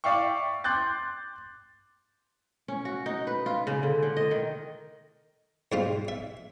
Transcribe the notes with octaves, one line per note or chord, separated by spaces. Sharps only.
D5 E5 F5 G5 C#6
C6 D6 F#6 G6 A6
C#4
F#4
D#4
B4
F4
C#3
D3
D3
D#5
D#3
G#2 G3 F4
E5